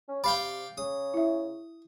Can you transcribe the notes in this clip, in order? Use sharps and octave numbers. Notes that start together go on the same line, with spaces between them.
C#4
C3 D5 F5 G5 B5
C#3 D#6
E4 E5